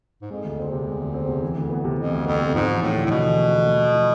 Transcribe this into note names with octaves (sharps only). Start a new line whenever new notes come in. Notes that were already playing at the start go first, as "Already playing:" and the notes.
G#2
F2 G#3
D2
E2 C4
C3
G#3
D2
C4
C3
E3
D2
B3
C3
F2 E3
D2
F2 B3
C3
G#2 F3
E2
A2 A3
D3
A2
B2 F3
E2
A3
D3
A3
F2
E4